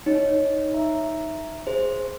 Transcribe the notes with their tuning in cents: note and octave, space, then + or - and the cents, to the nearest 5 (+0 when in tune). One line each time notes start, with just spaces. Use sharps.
D#4 +0 C#5 +0
E5 +0 A#5 +0
G#4 +0 C5 +0